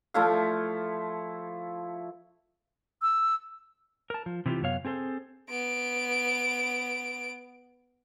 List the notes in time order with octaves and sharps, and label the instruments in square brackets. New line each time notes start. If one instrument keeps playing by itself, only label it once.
[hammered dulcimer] F3 A3 E4 F5
[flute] E6
[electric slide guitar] A#4 A5
F3
C3 E3 F#3 C4 F4 G4
F#2 C3 B3 C#5 F5
C4 G#4 A4 C5
[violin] B3 D7